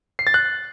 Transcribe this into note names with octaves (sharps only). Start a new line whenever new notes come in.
C7
A6
F#6